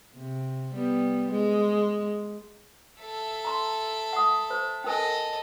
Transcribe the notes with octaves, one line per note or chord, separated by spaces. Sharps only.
C3
G3 B3
G#3
A4 E5
A#5 C6
F#5 D#6
C5
C#4 A4 A#4 D#5 G#5